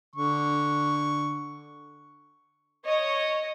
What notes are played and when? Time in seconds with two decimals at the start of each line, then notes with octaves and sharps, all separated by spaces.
0.16 D3 C#6
2.84 C#5 D#5